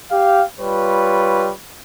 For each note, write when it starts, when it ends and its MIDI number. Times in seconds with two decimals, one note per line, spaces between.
0.11 0.43 67
0.11 0.43 77
0.59 1.52 55
0.59 1.52 65
0.59 1.52 71
0.59 1.52 73